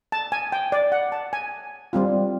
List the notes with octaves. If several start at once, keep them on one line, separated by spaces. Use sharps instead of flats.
A5
G#5
G5
D5
F#5
A5
G#5
G3 C4 F4